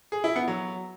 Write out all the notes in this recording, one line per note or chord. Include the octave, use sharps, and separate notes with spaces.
G#4
E4
B3
F#3